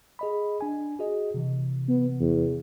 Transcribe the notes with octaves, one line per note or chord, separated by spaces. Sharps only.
G#4 D#5 B5
D4 G#5
F#4 G#4 D#5
C3 E3
B3
E2